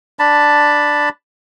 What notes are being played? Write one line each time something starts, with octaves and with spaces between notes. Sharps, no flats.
D4 A5 B5